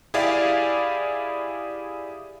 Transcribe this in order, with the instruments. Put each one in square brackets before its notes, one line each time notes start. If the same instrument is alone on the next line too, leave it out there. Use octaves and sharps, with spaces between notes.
[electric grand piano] E4 G4 G#4 D5 F5